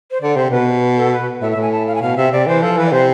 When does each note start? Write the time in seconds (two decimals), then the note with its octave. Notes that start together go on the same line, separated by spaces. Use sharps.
0.11 C5
0.21 D3 D5
0.36 C3 C5
0.51 B2 B4
0.97 A4
1.12 B4
1.42 A2 E5
1.52 E5
1.56 A2
1.62 G#5
1.72 A5
1.87 F5
1.95 G#5
2.01 B2 F5
2.16 C3 E5
2.32 C3 D5
2.47 E3 C5
2.62 F3 A4
2.77 E3 B4
2.86 D5
2.92 C3 C5